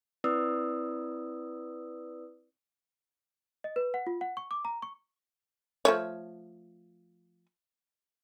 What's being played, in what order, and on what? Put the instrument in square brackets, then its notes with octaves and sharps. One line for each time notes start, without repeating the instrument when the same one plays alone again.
[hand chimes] C4 E4 B4 D5 D#6 E6
[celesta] D#5
B4
F#5
F4
F#5
C#6
D6
A#5
C#6
[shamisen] F3 A3 C#5